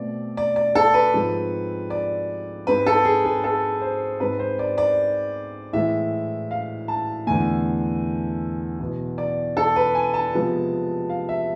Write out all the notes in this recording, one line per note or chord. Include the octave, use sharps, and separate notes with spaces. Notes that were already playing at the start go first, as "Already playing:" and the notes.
Already playing: B2 A3 C4 D5
D5
D5
A4
B4
G#2 F3 G#3 C4
D5
G#2 G#3 C4 B4
A4
G#4
G#4
A4
C5
G#2 G#3 C4 B4
C5
D5
D5
A2 E3 G#3 E5
F5
A5
E2 D3 A3 G#5
E2 B2 B3
D5
A4
B4
G#5
A5
C3 F3 G#3 B3
F5
E5